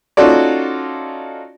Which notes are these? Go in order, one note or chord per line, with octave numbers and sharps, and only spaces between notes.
C#4 D#4 F4 F#4 A4 D5